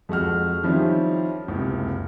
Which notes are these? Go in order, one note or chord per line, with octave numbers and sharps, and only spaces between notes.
F2 G#3 F#4 F6
D#3 F3 G3 C4 C#4 E4
F#1 C#2 C3